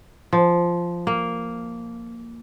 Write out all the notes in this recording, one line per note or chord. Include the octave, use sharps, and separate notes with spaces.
F3
A#3